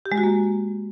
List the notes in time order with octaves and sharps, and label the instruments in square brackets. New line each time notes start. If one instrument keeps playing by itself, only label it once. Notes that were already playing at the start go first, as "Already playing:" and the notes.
[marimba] G4
G#3
F#4
A#3